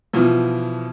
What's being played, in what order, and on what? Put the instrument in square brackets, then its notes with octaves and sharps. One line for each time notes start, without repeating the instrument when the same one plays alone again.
[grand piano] B2 E3 F3